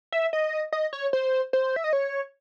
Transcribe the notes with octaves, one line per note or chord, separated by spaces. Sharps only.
E5
D#5
D#5
C#5
C5
C5
E5
D#5
C#5